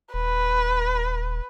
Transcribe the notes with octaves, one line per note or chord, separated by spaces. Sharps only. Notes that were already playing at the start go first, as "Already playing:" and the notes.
D#1 B4